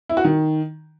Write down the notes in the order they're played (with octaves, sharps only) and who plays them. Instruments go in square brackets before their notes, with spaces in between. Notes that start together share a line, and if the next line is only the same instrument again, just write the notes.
[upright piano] E4
F#4
D#3